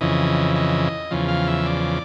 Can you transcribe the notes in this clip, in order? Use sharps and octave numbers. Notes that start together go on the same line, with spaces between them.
F2 C#3 E3 D#5
D#5
E2 C#3 F3
F5
E5
D5